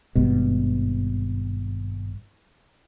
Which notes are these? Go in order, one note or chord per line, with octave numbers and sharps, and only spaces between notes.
G#1 G2 B2